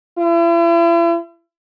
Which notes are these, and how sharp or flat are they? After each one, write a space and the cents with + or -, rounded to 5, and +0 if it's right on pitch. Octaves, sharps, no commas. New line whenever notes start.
E4 +40